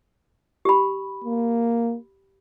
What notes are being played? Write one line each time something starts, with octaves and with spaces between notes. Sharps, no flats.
G4 B5
A#3